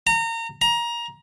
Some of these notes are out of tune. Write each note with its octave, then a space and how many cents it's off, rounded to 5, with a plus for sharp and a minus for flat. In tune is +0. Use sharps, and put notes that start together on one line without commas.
A#5 -30
A#5 +20